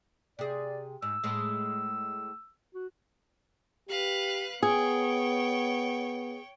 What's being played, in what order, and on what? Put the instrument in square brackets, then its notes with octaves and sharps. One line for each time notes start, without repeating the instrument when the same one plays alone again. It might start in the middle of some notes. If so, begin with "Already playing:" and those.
[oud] C3 G#4 [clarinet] D5
[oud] G#2 [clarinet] E6
[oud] A2 G#3
[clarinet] F#4
[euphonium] G4 [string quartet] B4 F5 F#6
[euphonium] B3 [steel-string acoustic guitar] G#4 [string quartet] C#5 G5